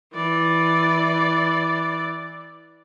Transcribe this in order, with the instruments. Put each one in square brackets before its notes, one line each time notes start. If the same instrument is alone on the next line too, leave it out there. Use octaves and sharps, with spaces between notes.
[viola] E3 D5